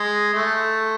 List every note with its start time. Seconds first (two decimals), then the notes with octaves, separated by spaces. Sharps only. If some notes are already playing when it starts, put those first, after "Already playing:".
Already playing: G#3
0.34 A3